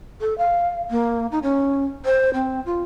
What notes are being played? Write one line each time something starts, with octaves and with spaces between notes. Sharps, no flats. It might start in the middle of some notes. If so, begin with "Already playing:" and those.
A4
F5
A#3
D#4
C#4
C5
C4
F4